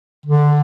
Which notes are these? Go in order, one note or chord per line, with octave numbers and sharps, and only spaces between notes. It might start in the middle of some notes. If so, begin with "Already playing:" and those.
D3